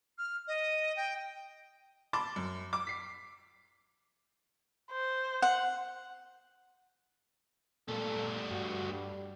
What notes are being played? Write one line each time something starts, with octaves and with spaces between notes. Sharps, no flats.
F6
D#5
G5
A5 B5 C6 D6 A6
F#2
D6
B6 C7
C5
F#5
A#2 G3 A3 A4
G2 F#4
G3